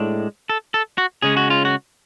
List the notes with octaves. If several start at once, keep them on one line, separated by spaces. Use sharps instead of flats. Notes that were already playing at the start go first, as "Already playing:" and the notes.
Already playing: A2 G#3 D4
A4
A4
F#4
C#3 G#3 C#4 G#4
F#4
F4
F#4